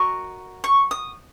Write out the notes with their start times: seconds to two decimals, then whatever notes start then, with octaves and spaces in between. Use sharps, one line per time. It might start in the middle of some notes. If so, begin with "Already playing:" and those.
Already playing: F#4 A#4 D#5 C#6
0.64 C#6
0.91 D#6